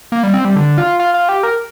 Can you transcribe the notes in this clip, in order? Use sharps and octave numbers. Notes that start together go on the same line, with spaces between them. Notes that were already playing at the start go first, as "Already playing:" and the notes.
A#3
G3
C4
G3
D3
F4
F4
F4
G4
A#4